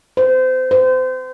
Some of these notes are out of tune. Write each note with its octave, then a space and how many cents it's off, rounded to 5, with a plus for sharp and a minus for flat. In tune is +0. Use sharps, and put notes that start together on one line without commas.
C5 -25
C5 -30